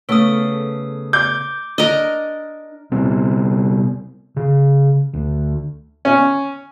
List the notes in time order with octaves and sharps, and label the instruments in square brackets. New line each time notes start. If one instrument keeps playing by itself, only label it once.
[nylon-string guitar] C#3 A3 B3 [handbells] A4 D#6
[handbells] D6 [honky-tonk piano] G6
[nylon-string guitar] D4 [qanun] A#4 D#5
[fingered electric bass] C3 G3 B3 C4
C#3
D2
[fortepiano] C#4